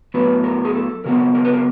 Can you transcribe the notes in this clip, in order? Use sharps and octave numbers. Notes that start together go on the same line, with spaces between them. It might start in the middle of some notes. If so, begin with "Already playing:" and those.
A2 F#3 B3 B4
A#4
G#4
A4
C#3 F#3 B3 A#4
A#4
B4
A#4